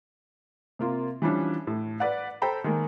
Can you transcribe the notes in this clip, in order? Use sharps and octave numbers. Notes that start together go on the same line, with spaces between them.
C3 A#3 F4
E3 F3 G3 C#4 D4
A2
B4 D5 F#5
A4 C5 G5 A#5 B5
D#3 G#3 A#3